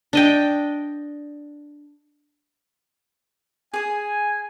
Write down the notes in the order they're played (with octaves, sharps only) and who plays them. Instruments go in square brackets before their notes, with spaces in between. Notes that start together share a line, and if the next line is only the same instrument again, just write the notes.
[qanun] D4 D#5 G5
[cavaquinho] G#4 D#6 [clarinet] G#5